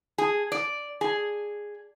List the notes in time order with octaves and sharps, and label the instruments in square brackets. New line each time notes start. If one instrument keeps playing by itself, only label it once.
[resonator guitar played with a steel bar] G#4
D5
G#4